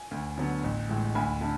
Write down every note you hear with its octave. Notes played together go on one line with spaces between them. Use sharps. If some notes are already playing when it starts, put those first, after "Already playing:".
Already playing: G#5
D2
D3 F#3 B3
A1
A2 E3 G#3
D2 G#5 B5
D3 A3